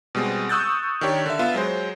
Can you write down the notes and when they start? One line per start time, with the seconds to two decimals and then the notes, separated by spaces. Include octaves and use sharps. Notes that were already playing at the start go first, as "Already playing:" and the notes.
0.15 B2 G3 G#3 C4
0.49 C#6 D#6 E6 F#6 G6 A6
1.01 D#3 D4 G4 C#5
1.26 D3 E5
1.39 B3 F4 E5
1.54 F#3 G#3 C5